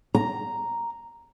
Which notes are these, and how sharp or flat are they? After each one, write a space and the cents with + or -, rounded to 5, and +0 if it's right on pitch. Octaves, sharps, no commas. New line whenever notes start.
A#5 +0